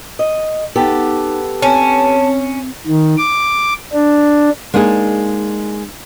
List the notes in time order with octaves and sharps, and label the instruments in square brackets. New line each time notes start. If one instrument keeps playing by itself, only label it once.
[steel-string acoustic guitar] D#5
[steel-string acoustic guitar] B3 G4 A4 [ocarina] D#4
[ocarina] C4 [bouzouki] C#4 [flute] A5
[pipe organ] D#3
D6
D4
[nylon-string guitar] G#3 A#3 D4 D#4 G#4